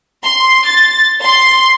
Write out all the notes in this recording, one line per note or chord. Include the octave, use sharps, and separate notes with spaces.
C6
A6
C6